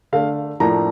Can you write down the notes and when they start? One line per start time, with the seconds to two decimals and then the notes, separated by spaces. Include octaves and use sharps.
0.13 D3 A3 D4 F5
0.60 A2 F3 A#3 D4 A#5